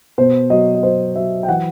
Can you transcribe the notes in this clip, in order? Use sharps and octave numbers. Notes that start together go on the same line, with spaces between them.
B2 C5
F#3 D#5
D#5
F#3 C5
F#3 E5
G5
E3 F#5